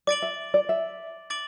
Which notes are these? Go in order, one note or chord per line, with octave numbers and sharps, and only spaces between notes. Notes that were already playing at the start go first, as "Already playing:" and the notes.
D5 D6 A6 D7 F#7
E5
D5
E5
D6 A6 D7 F#7